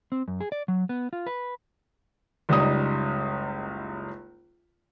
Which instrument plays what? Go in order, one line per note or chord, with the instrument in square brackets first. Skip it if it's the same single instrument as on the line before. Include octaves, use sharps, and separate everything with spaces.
[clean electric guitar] C4
F#2
G#4
D5
F#3
B3
F4
B4
[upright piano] F#1 C#2 G3 D#4 D#6